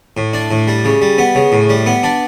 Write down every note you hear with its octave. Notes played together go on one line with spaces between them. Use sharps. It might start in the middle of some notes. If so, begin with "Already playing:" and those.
A2
D4
A2
G3
C#3
G3
B3
C#3
A2
G3
B3
D4